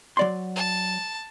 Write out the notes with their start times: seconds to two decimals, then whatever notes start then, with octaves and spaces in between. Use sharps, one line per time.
0.17 F#3 D5 C6
0.56 A5